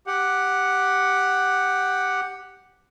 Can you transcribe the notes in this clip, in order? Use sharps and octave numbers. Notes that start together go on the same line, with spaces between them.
G4 F#5